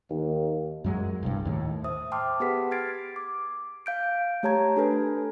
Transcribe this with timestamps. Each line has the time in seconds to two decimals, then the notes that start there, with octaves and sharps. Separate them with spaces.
0.10 D#2
0.84 F#2 F#3 G#3
1.23 E1 C2 G2
1.45 D#2 A2
1.84 C5 E5 D#6
2.12 G5 A5 C6 D6 F6
2.40 B3 G4 G#4 B4 F#5 B6
2.71 C6 F6 G#6 A6 C7 D7
3.16 D6
3.86 F5 G6 D7
4.43 A3 G4 C#5 A5 A#5 G#6
4.76 D4 A4 B4 G#5